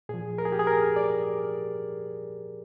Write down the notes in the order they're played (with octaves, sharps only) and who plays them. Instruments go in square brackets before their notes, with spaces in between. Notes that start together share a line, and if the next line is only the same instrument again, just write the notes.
[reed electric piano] A#2 F3 G#4
A#4
G#4
G4
G#4
A#4
D5